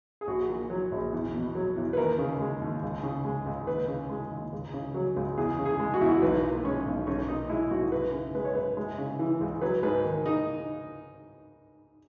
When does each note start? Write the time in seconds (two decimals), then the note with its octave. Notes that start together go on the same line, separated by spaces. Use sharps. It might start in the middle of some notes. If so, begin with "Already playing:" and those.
0.21 G#4
0.27 A#1 F#4
0.49 A#2
0.70 F#3
0.92 A#1
1.12 E2
1.34 B2
1.55 F#3
1.76 E2
1.93 B4
1.97 D#2 A#4
2.19 C#3
2.40 G#3
2.61 D#2
2.83 C#2
3.03 C#3
3.25 G#3
3.46 C#2
3.67 D#2 B4
3.88 C#3
4.10 G#3
4.31 D#2
4.53 C#2
4.74 C#3
4.94 F#3
5.16 C#2
5.37 E2 G#4
5.59 C#3
5.65 G#4
5.80 G#3
5.94 F#4
6.01 E2 E4
6.09 F#4
6.22 B1 B4
6.44 A#2
6.64 G#3 C#4
6.86 B1
7.07 B1 C#4
7.28 A#2 D#4
7.49 G#3 E4
7.71 B1 F#4
7.92 F#2 B4
8.13 C#3
8.35 G#3 B4
8.45 C#5
8.55 F#2 B4
8.77 G#3
8.98 C#3
9.19 E3
9.41 C#2
9.62 F#3 B4
9.83 G#2 B4
10.05 D#3
10.26 D#4